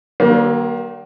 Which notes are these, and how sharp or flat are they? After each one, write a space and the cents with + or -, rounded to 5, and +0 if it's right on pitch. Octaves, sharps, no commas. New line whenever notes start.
D#3 -25 G3 -35 A#3 +25